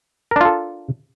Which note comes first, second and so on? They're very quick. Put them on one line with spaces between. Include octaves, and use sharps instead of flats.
A#4 D4 F4 A4